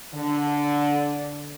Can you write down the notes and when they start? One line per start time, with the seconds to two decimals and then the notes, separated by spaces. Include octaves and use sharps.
0.15 D3